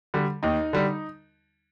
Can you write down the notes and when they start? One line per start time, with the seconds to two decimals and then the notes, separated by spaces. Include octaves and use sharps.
0.14 D3 G3
0.43 D#2 D#4
0.73 D3 G3